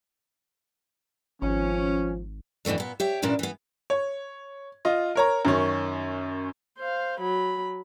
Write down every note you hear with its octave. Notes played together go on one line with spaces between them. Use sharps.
G#1 F3 C#4
F2 B2 E3 A3 D4
A#2 B3
G4 C#5 E5
A#2 C#3 E3 D4 E4
E3 B3
C#5
F4 D#5
A#4 C#5 A#5
F#2 D#3 C#4
C5 F5
F#3 B5